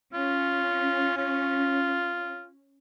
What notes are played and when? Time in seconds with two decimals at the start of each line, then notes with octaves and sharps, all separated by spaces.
0.14 C#4 F4
1.18 F4